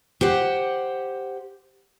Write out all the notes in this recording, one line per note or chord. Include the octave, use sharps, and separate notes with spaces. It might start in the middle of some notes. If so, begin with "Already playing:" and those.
G4 C5 F#5